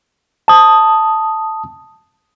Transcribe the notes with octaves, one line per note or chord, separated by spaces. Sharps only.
A5 D#6